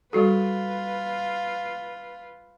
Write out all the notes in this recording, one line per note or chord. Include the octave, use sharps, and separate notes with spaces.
G3 F4 F#4 A4 B4